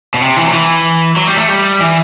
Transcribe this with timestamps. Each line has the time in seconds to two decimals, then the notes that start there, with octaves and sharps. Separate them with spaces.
0.14 B2
0.21 C3
0.37 E3
0.46 F#3
0.53 E3
1.16 F#3
1.27 G3
1.38 A3
1.48 G3
1.80 E3